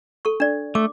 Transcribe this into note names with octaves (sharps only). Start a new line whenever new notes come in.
A4 C#6
D4 D5
A3 D6